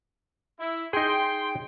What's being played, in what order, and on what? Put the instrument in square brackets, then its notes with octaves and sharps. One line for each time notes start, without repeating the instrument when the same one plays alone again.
[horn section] E4
[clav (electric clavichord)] D#4 G#4 [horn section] G5 C6